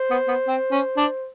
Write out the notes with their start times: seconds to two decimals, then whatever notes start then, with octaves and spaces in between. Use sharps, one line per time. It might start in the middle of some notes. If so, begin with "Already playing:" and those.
Already playing: C5
0.11 B3
0.28 B3
0.48 C4
0.72 C#4
0.97 D4